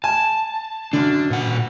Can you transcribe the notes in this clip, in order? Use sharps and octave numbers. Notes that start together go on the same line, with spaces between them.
G#5 A5
F#2 D3 D4
A#2 F#5